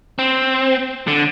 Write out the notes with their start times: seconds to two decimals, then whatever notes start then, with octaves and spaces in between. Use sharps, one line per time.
0.19 C4
1.08 D3